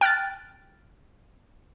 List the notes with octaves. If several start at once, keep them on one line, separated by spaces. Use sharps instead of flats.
G5 F6 F#6 A6